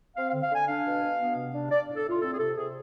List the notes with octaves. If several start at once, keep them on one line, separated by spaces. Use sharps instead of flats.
C4 F5
F5
D3
F5
D3 G#5
D4 F5
B2
B2
B3
C3
D4
D4 D5
A2
A4
A2 F4
C4 A4
G#4
C3 A4
C3 G#4